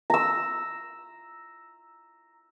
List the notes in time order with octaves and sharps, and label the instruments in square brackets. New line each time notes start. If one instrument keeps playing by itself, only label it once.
[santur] A#5 E6